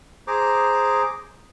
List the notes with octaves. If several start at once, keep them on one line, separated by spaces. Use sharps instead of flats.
G#4 C5 A#5 D6